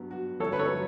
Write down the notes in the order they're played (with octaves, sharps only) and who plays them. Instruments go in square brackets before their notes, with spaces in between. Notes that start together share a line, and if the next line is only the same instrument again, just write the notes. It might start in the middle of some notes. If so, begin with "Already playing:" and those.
Already playing: [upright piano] G2 F#3 B3
F#4
[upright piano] G1 [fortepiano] A4 C#5
[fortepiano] B4
A4 C#5
[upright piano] F#3